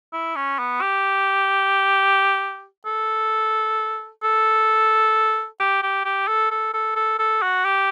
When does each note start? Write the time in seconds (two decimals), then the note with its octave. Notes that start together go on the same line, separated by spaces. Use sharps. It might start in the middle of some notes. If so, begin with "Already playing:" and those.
0.13 E4
0.36 C#4
0.59 B3
0.82 G4
2.86 A4
4.23 A4
5.60 G4
5.83 G4
6.05 G4
6.28 A4
6.51 A4
6.74 A4
6.96 A4
7.19 A4
7.42 F#4
7.65 G4